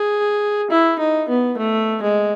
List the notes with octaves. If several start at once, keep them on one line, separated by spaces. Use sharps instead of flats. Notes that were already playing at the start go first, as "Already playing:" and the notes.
Already playing: G#4
E4
D#4
B3
A3
G#3